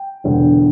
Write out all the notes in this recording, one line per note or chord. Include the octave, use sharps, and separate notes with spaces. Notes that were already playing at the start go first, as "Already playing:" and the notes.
Already playing: G5
E1 E2 D3